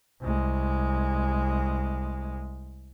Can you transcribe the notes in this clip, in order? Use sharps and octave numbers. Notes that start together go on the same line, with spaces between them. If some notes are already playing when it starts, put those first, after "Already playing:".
C2 G#3